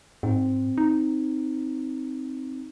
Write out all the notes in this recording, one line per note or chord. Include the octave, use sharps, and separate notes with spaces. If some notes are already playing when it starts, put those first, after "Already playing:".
G#2 C4
D#4